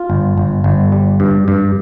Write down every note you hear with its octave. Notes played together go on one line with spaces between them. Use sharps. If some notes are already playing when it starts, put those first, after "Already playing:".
Already playing: F4
G1
G1
G1
G3
G2
G2